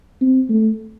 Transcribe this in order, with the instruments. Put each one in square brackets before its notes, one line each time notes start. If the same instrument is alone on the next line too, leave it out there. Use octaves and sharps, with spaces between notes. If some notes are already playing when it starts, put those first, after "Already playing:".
[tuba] C4
A3